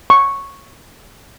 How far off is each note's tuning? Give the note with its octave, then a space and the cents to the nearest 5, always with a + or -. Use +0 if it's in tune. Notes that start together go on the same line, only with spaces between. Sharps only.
C#6 -5